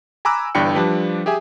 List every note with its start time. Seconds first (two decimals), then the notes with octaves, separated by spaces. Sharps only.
0.25 G#5 A#5 B5 D6 E6 F#6
0.55 G1 G2 E3 D4 G5 C#7
0.75 F3 G3 D4 G4 B4
1.26 G4 G#4 E5 G#5